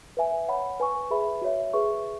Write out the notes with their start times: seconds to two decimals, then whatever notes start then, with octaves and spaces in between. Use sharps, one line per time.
0.17 B4 E5 G#5
0.48 C#5 F#5 B5
0.80 B4 G#5 C#6
1.10 G#4 B4 E5 B5
1.42 F#4 C#5 E5
1.73 G#4 B4 E5 C#6